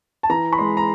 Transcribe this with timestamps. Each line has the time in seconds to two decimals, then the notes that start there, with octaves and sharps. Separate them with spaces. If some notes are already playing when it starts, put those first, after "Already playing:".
0.23 A5
0.30 E3 A#5
0.53 B5
0.58 G#3 C6
0.77 A#5